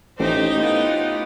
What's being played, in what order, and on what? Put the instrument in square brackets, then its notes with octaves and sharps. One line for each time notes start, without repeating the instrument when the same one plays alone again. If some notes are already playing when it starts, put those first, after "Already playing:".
[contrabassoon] A1 [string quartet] D#4 G4 D#5 [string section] C5
[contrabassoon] A2 [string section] B3 F4